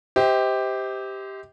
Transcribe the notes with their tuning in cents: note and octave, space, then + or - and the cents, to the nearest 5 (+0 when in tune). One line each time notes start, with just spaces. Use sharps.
G4 +0 C5 -20 D#5 +45